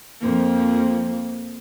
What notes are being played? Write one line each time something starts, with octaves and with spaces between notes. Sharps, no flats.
F2 F3 A#3